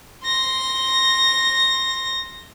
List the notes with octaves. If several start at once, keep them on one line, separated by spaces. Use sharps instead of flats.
C6 A#6